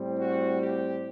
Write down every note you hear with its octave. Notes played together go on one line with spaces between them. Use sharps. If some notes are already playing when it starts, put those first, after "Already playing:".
Already playing: A2 G3 C4
F#4
G4